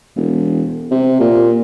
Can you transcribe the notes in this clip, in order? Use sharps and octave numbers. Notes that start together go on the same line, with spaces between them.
E1
C3
A#2